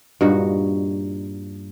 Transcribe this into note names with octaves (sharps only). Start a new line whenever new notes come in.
G2 A#2 D#4 F#4